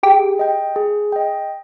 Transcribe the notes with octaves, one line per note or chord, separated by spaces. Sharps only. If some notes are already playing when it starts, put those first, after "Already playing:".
G4 G#4
D#5 G5
G#4
D#5 G5